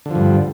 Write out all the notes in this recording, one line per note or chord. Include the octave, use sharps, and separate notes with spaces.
G2 D3 F3